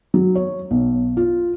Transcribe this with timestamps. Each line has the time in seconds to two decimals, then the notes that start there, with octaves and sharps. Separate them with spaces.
0.14 F#3
0.35 C#5
0.71 B1
1.17 F4